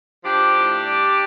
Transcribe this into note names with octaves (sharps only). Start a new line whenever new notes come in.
F3 D4 G4
A2
G3